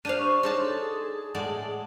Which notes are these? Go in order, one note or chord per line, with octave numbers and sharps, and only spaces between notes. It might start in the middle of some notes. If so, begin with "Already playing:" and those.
D4 G4 C5 F5 D#7
C#6
D4 D#4 G#4 C#5 A5 C6
A4
A2 G#3 D5 F#5 A5